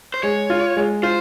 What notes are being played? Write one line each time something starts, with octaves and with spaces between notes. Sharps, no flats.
C5
G#3 C#5
F4
G#3
F4 C5